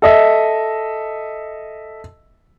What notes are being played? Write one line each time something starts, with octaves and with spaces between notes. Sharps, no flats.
A4 D#5 E5